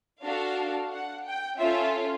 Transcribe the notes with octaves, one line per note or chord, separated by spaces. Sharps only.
D4 F#4 A4 F5
F#5
G5
C#4 F4 A4 E5